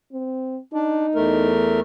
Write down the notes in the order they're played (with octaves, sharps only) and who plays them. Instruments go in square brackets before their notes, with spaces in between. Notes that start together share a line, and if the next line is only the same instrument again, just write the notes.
[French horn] C4
[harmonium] D4 [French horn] D#4
[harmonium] E2 A3 A#4